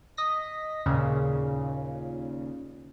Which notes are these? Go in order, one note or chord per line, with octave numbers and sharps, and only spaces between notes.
D#5 A#6 B6
D#2 A#2 C#3